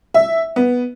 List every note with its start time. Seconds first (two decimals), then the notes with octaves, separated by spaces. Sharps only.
0.14 E5
0.56 B3